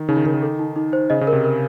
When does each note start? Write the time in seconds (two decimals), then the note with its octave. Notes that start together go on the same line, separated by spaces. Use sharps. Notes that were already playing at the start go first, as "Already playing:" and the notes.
Already playing: D#3
0.09 C#3 D#4
0.17 D#3
0.26 C#3 A#4
0.34 D#3
0.42 A4
0.59 D#4
0.76 D#4
0.93 C5
1.10 C#3 D#5
1.21 C#3
1.27 A#4
1.33 C3
1.44 A#4